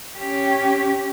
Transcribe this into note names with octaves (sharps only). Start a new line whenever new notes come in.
C#4 G4